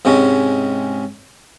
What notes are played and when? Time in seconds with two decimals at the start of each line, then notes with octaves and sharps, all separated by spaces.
0.05 G#2 C3 G#3 C#4